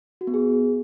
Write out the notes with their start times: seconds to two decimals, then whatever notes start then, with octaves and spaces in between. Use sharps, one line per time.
0.21 F#4
0.27 B3
0.34 G#4